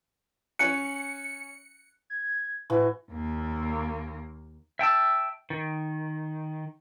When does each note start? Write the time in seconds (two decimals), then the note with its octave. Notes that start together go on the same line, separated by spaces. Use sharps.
0.59 C#4 G#5 F#6 C#7
2.10 G#6
2.70 A2 E3 F#4
3.11 D#2 A#3
4.79 E5 G5 A5 E6
5.50 D#3